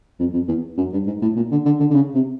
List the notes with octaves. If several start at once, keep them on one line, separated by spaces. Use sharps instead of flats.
F2
F2
E2
F#2
G2
G#2
A2
A#2
D3
D3
D3
D3
C#3
C3